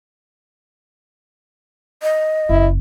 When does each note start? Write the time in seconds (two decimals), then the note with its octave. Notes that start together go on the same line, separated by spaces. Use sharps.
2.02 D#5
2.49 F#1 E4